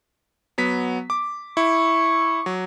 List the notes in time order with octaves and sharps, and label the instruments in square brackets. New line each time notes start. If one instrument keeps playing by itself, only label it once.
[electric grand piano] F#3 B3 B6
D6
[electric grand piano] E4 [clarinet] C#6
[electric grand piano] F#3